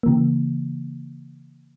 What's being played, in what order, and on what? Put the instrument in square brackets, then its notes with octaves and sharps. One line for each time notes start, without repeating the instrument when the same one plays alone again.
[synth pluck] C#3 E3 A#3